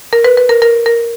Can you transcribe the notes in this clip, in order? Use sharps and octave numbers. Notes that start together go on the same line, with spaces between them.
A#4
B4
B4
A#4
A#4
A#4